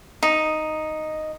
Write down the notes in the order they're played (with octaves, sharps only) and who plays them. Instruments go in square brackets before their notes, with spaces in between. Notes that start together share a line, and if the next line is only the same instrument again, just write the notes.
[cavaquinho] D#4